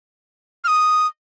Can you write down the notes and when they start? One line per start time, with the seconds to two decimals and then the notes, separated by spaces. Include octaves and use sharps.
0.64 F6
0.68 D#6